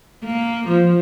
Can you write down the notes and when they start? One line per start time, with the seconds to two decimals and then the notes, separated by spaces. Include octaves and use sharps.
0.24 A#3
0.68 F3